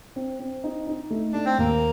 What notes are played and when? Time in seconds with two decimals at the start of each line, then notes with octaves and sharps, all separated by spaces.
0.16 C4
0.40 C4
0.64 D#4
0.87 D#4
1.11 A3
1.33 A3 D4
1.45 C4
1.58 D#2 A#3